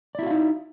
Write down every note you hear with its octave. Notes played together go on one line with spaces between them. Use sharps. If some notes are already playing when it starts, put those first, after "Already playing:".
D#4 E4 F#4 D5 F5